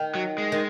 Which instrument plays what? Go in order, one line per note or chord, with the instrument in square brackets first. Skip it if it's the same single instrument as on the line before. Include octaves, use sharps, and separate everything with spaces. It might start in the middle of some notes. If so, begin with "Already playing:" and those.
Already playing: [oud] D#3
[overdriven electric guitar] F#3
G#3
[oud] D#3